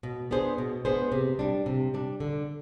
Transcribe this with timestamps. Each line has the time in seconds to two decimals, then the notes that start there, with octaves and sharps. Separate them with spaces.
0.03 B2
0.31 B3 D4 G#4 C5
0.58 B2
0.85 B3 D4 G#4 C5
1.12 C3
1.39 G3 D4
1.66 C3
1.94 G3 D4
2.20 D3